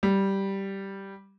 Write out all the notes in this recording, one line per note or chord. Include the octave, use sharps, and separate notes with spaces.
G3